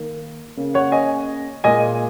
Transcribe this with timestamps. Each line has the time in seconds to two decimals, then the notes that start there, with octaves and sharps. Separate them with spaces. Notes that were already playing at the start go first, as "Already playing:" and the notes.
Already playing: D#3 A#3
0.57 C#3 A#3
0.74 C#5 F#5
0.92 D#5 G#5
1.64 A#2 G#3 D#5 G#5